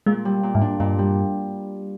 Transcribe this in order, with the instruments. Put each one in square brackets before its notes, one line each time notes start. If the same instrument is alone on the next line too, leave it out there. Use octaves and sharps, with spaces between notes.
[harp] A#2 [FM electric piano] G#3
[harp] G3
A#2
[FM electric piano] G#2
[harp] D4
[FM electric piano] G2 [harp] A#2
[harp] G3